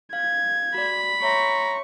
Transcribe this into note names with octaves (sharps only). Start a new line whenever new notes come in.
F5 G#6
F#4 D5 B5
C#5 E5 A#5 C6 C#6